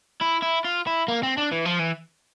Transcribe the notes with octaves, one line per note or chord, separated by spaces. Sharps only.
E4
E4
F4
E4
A#3
C4
D4
E3
F3
E3